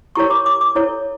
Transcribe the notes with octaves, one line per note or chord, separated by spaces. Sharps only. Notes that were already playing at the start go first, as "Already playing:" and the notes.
E4 G4 A#4 C#5 C#6
D6
D6
D6
E4 A4 C#5